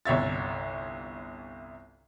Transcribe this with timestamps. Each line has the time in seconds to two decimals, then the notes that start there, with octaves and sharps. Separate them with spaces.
0.05 G1 C2 C#5 E5 A6